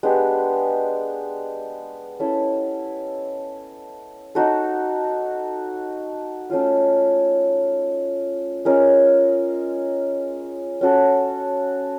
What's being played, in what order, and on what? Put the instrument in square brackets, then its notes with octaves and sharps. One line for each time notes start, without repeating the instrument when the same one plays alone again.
[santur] G#3 B3 D4 G4
C#4 E4 A4
D#4 F#4 A4
A3 C#4 F4
G#3 C#4 F4 A#4
C#4 F#4 A4